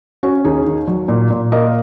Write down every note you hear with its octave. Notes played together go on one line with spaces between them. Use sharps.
C#4 F#4
D#2 D#4 G#4
D#3
F#3
A#2
A#2
A#3 A#4 D#5